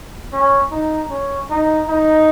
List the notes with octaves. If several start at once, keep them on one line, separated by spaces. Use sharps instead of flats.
C#4
D#4
C#4
D#4
D#4